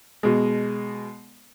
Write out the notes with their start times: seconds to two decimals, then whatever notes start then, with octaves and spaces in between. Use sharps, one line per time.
0.23 B2 G#3